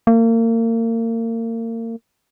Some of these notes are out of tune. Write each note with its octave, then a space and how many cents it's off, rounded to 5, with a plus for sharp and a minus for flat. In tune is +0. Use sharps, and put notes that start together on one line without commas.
A#3 -35